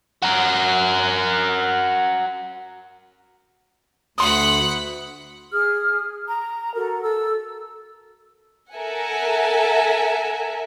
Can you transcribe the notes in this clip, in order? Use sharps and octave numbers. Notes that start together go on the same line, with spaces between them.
F#4 A#4
D2 F#5 B5 C6 D#6
G#4 D#6 F6
A#5
F#4 A4 A#4 A#5
A4 E6
A4 A#4 E5 F#5 G#5